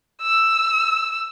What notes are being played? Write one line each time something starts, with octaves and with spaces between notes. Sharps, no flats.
E6